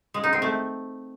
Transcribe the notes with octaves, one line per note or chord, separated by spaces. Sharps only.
G#3
D#4
C4
A3